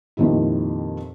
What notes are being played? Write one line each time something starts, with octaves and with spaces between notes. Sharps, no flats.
F2 A#2 D#3 G3 E4